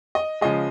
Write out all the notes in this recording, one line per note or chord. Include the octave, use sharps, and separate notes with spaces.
D#5
C#3 F3 G#3 D#5